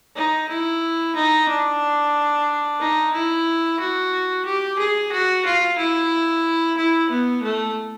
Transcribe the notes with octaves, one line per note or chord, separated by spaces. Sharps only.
D#4
E4
D#4
D4
D#4
E4
F#4
G4
G#4
F#4
F4
E4
E4
B3
A3